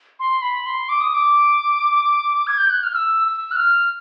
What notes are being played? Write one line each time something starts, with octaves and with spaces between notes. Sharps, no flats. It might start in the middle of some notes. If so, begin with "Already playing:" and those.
C6
B5
C6
D6
D#6
D6
G#6
G6
F#6
F6
E6
E6
F#6
F6